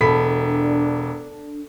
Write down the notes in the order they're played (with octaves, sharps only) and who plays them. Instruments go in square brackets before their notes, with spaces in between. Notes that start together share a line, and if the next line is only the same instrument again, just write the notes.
[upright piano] E1 B5 B6 [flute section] D4 [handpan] A4